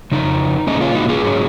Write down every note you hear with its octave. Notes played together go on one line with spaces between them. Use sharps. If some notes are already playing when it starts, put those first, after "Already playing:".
F2 C#3 D#4
A#2 G#3 C#4 D#4
C#4 F4
D#4 F#4
F4 G#4
G#2 F#3 C#4